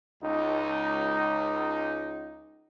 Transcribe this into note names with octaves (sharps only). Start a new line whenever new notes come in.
C#2 D#4